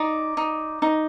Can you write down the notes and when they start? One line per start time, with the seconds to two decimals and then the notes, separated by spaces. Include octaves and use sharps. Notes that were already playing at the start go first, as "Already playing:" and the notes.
Already playing: D#4 D5
0.37 D#4
0.82 D#4